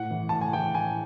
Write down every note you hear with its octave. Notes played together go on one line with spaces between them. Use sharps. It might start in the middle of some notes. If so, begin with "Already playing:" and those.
Already playing: A2 F#5
E3
A2 A5
G#5
E3 G5
A2 G#5